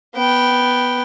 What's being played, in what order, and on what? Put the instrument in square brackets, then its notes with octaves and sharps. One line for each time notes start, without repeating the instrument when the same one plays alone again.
[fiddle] B3 G5